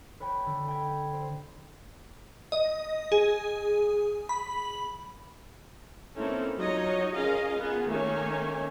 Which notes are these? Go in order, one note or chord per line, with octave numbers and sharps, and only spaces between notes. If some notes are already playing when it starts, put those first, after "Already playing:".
B4 C#5 G5 B5
D3
G5 B5 G#6
C5
D#5
G#4
B5
A#3 C4 C#4 D#4 E4 A4
F#3 D#4 F4 C#5 D#5
C#4 F4 G#4 A#4 D#5 F5
B3 F4 G#4
D#3 A3 A#3 C#4 C#5 G#5